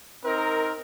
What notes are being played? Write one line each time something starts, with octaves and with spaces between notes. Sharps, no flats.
C4 D#4 A#4